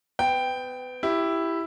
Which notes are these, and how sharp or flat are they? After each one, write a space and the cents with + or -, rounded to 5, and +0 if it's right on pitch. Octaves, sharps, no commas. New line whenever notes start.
B3 +30 G5 +0
E4 +5 G4 +0